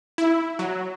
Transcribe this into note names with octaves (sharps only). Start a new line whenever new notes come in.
E4
F#3